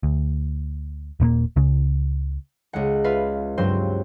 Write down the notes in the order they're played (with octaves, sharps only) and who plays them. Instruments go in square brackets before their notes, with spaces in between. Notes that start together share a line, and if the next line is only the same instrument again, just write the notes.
[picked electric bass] D2
D#1 A#2 A3 A#3
C#2 C#3
[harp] C#2 G#3 F#5
F4 B4 E5 F5
C#2 G2 F#3 C4 C5 C6